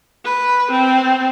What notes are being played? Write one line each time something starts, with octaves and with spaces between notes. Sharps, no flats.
B4
C4